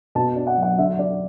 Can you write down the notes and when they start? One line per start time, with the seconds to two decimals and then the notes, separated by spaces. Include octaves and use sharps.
0.15 B2 A5
0.36 D4
0.47 F#5
0.57 F#3
0.62 F#5
0.78 D3 E5
0.99 D3 D5